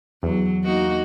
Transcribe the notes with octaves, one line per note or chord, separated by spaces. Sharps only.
E2 F#3
A#3 D#4 F#4